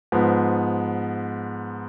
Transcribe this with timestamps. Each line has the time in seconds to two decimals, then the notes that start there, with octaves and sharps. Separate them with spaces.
0.12 G#2 F3 B3